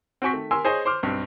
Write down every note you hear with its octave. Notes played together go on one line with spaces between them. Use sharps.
C4 F#4 C5 G#5 C#6 B6
D#3 A3
A#4 G#5 C6 E6
G#4 C5 C#5 D#5 G#5
C5 C6 D6 F6
B1 G2 C4